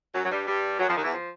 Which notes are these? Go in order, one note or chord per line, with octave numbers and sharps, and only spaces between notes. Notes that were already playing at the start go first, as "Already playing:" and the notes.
F#2 F#3
F#3
G2 G3
G2 G3
F#2 F#3
F2 F3
D#2 D#3
E2 E3
F3